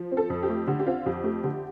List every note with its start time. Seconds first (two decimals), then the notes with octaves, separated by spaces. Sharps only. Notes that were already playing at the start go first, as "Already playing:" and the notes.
Already playing: F3
0.11 C4
0.17 A4
0.30 F2
0.43 G4
0.49 A3
0.67 D3 G4
0.79 G4
0.86 C4 F4
1.06 F2 G4
1.24 A3 G4
1.43 D3 G4